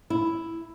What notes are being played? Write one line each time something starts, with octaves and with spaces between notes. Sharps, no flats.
E4